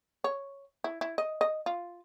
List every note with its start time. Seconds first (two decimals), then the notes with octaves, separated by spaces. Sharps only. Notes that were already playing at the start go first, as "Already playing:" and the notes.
0.24 C#5
0.84 E4
1.01 E4
1.18 D#5
1.41 D#5
1.66 F4